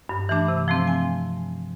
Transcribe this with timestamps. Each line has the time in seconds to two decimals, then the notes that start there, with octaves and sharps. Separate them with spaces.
0.09 G2
0.29 E3 A3 D4
0.48 C3
0.68 F3 A3 C4
0.87 G#5